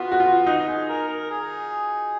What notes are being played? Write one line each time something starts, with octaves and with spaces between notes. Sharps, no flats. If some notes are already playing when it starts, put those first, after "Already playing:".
Already playing: B3 F4 F#4
F#4
F4
B3 D#4
G#4
A#4
A#4
G#4